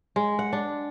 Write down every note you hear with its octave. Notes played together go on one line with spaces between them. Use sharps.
G#3
F#5
D4